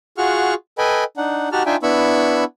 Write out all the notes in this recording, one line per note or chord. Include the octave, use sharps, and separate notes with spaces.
F4 F#4 G#4 F#5 C#6 F6
A4 B4 D#5 G5 G#5 B5
D4 D#4 F#5
D#4 F#4 G4 F#5 A5 F6
D4 D#4 F4 E5 G5 G#5
B3 D4 E4 B5 C#6 E6